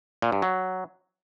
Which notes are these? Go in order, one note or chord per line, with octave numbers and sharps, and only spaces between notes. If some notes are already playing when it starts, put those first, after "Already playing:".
A#2
G2
F#3